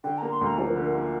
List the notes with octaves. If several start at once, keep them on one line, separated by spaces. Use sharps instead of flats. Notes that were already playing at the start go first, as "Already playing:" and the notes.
D3 G5
A#3 A#5
C6
D2 A#5
F3 C5
A#4
D3
A#4
A#3